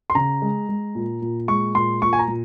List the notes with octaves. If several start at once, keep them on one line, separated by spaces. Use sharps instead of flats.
C6
C#3 A#5
G#3
G#3
A#2
A#2
G#3 C#6
A#2 C6
A#2 C#6
G#5
A#5
A#2